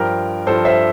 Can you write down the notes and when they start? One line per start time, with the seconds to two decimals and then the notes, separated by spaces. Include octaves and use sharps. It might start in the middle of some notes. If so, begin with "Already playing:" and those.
Already playing: G2 F3 G4 A#4
0.47 G2 F3 A4 C5
0.65 C5 E5